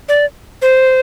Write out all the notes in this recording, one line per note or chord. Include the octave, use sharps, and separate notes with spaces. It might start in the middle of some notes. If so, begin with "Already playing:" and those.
D5
C5